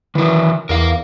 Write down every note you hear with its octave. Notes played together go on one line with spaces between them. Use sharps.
D#3 E3 F#3
E2 A#4 F5